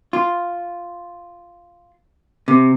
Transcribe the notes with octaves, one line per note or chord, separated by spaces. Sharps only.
F4
C3